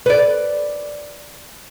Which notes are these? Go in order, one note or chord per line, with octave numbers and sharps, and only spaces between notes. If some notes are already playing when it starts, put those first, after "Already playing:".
B4 D5